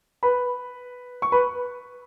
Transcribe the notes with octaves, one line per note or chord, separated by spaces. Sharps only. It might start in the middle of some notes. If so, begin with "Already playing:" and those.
B4 B5
C#6
B4 B5